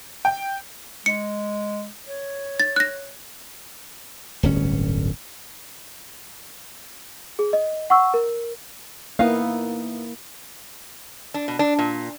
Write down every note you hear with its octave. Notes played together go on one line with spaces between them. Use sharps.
G5
G#3 C#7
C#5
A6
F#6 A#6
D1 G1 C#4
G#4
D#5
F#5 C#6 E6
A#4
A#3 B3 D#4 E4 F5
D4
B2
D4
A#2